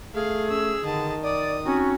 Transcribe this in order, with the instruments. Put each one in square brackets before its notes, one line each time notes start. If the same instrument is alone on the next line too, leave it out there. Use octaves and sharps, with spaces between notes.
[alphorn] A3 [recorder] G#4 [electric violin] F5
[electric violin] C#4 E6
[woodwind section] D3 [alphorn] D#3 [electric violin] D#5 A5
[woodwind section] D5 [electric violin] D#6
[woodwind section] C4 D#4 F#4 [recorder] C#4